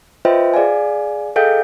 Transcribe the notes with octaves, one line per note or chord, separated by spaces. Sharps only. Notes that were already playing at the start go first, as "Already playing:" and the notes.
F4 B4 C5 D#5 E5 G5
G#4 D5 F5 G#5
G#4 A4 D#5 F5 G5 G6